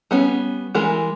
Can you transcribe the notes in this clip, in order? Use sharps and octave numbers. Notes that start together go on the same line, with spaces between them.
G3 B3 C#4
E3 G3 G#3 A#4